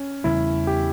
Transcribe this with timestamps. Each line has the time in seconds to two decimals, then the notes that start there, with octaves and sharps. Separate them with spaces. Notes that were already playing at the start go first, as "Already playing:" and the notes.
Already playing: C#4
0.24 E2 C#3 G3 B3 E4
0.67 G4